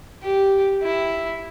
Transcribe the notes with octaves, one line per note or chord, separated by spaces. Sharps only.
G4
E4